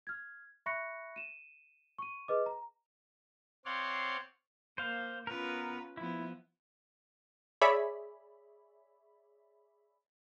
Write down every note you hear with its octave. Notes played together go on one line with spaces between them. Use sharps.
F6 G#6
E5 B5 C#6 F#6 A#6 C#7
D#7 E7
C#6 D#7
G#4 B4 D#5 D6
A#5
C4 C#5 D5 F5 F#5 C6
A#3 C5 F5
B3 C#4 F4 A#4 B4
F3 B3 E4
G#4 C#5 D5 E5 B5